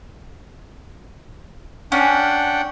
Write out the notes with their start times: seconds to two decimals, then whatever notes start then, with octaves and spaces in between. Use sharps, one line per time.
1.92 C#4 D4 F#5 G5